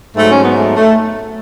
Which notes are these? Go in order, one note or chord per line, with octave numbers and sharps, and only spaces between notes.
G#2 F#3 A3
C#4
B3
A3
A3